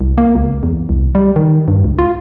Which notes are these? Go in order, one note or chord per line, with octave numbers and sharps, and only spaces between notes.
C2
A#3
C#2
E2
C2
G3
D#3
G2
C#2
F4